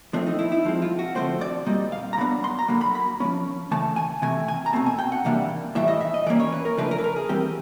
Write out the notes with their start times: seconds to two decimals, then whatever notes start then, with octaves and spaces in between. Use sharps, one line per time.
0.13 F3 A3 C4 D4
0.27 D#4
0.39 E4
0.52 E4
0.65 F3 G#3 C4
0.82 F4
0.99 F#4
1.15 D3 F3 A3 C4 C5
1.41 D5
1.66 A#2 G3 C4 D#5
1.92 F5
2.13 A#5
2.17 D#3 F#3 B3 D4 B5
2.44 C6
2.59 A#5
2.68 D3 F#3 A#3 B5
2.81 B5
2.95 B5
3.20 F3 A#3 C#4
3.71 C#3 E3 A3 A5
3.96 G#5
4.22 C3 E3 A3 G#5
4.48 G#5
4.66 A#5
4.73 B2 F#3 A3 C4 A5
4.86 G#5
4.99 G5
5.12 F#5
5.25 C3 E3 G3 A#3 D4 F5
5.75 A2 E3 G3 E5
5.88 D#5
6.01 E5
6.14 D#5
6.26 E3 G3 A#3 C#4 D5
6.40 C#5
6.52 B4
6.65 A#4
6.77 C#3 F3 A3 D4 B4
6.91 A#4
6.98 B4
7.04 A#4
7.16 G#4
7.29 E3 G3 C4 G4